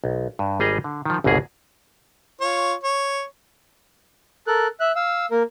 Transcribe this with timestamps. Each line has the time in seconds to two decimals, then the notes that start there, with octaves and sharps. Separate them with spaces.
0.04 B1
0.39 G2
0.60 G#1 G3 G#4 D#5 A#5
0.84 D3
1.05 D#3 F3
1.24 G1 C2 B2 A#3 G#4
2.41 F4 C#5
2.84 C#5
4.47 A4 A#4 F#6
4.80 E5 F#6
4.96 F5 E6
5.31 A#3 A#4